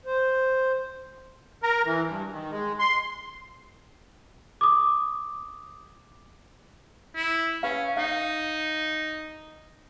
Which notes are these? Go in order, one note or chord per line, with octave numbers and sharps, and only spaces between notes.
C5
A#4
E3
G2
D#3
G#3
C6
D6 D#6
E4
C#4 B4 F5
D#4 F5